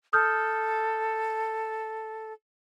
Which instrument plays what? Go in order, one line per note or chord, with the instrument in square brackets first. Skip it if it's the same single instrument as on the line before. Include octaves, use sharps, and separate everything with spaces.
[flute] A4 [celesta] D#6 F6 G6